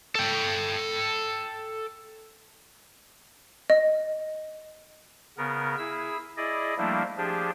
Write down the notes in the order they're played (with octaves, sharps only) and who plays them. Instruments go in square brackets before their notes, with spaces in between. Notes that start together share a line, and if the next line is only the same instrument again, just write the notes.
[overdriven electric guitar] A4 G5
[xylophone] D#5
[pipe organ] C#3 B3 A#4
E4 G#4 E6
E4 G#4 D5 D#5
F3 G3 A3 A#3 D4 E4
F3 D4 G4 G#4